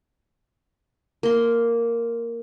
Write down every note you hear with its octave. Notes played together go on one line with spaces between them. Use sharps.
A#3 C6